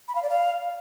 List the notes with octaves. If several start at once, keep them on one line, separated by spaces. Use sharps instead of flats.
B5
F5
D5
F5